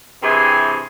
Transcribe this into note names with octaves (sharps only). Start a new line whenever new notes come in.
G2 C3 E3 G#4 G#5